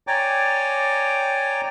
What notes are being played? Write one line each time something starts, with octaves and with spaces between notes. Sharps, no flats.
C#5 D5 G5 G#5 A#5 D6